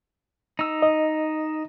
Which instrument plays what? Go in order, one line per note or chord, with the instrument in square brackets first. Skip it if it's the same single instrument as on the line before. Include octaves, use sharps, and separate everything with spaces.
[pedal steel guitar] D#4 E6
[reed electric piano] D#5